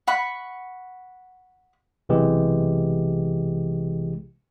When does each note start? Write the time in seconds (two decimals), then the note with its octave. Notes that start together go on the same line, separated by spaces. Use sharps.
0.07 F#5 B5 C#6
2.09 B1 C3 E3 G#3 G4